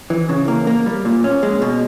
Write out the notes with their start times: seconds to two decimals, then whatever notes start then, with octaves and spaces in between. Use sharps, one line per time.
0.10 E3
0.29 C#3
0.48 A#3
0.67 A#3
0.86 G3
1.05 A#2
1.24 C#4
1.43 G#3
1.62 B2